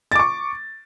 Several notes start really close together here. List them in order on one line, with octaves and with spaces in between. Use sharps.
A6 D6 C#6